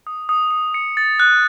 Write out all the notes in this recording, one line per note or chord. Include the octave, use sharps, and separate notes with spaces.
D#6
D#6
D#6
C#7
A6
F#6